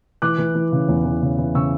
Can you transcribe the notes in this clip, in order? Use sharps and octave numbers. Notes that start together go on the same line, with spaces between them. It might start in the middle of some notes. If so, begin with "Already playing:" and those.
E3 D6 F#6
E3
E3
C#3
E2
E3
C#3
E3
C#3 C#6 E6